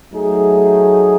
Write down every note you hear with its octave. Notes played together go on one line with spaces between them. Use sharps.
F#3 A3 D#4 G#4